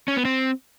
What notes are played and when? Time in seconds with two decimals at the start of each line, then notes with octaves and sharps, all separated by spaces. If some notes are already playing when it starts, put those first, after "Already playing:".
0.08 C#4
0.17 B3
0.25 C4